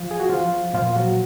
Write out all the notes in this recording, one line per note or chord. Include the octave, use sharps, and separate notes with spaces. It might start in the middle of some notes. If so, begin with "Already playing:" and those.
Already playing: F3 F4
G#4
F#4
F3 F4
A#2 F3 F4
F#3 F#4